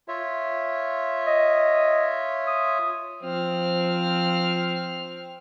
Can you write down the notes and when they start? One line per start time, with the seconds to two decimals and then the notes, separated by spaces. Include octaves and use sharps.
0.08 F4 C#5 E5
1.27 D#5
2.47 D#6
3.23 F3 C4 F6